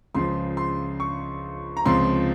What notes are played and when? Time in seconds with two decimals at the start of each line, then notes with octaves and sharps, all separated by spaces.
0.15 C#2 C#3 F3 C6
0.57 C6
1.00 C#6
1.77 A#5
1.85 C#2 C3 F3 C6